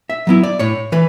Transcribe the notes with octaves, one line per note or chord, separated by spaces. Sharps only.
E5
F#3 B3 E4
D5
A2 C#5
E3 B4